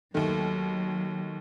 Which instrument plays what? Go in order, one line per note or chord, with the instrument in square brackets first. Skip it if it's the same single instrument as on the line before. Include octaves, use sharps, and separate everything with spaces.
[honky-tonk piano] D#2 D#3 A3 [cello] F#3